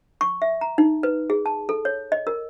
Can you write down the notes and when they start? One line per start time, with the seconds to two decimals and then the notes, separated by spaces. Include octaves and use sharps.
0.21 C#6
0.42 E5
0.61 A#5
0.78 D#4
1.03 B4
1.30 G#4
1.46 A5
1.69 A4
1.85 C#5
2.12 D#5
2.27 A#4